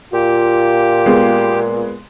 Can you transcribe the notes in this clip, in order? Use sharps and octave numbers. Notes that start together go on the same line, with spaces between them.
A#2 F4 G4
G#3 B3